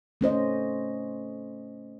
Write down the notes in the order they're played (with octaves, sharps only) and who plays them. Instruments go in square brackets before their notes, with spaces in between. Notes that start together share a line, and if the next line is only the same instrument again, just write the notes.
[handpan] A3 C#4 C5 D#5